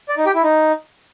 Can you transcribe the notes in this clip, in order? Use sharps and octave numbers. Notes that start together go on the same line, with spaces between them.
D5
D#4
G4
E4
D#4